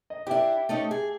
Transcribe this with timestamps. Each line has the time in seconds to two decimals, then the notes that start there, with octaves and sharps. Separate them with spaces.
0.10 D#5
0.27 D4 E4 G4 E5
0.69 A3 C#4 D#4
0.91 G#4